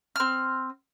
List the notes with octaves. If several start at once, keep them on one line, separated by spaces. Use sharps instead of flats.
C4 F6